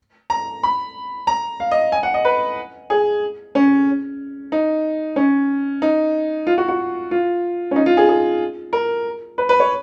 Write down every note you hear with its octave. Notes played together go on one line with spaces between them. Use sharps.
A#5
B5
A#5
F5
D#5
G#5
F#5
D#5
B4
G#4
C#4
D#4
C#4
D#4
F4
F#4
F#4
F4
C#4
D#4
F4
G#4
G#4
A#4
B4
B4
C#5